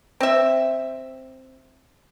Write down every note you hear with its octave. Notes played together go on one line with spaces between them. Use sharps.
C4 E5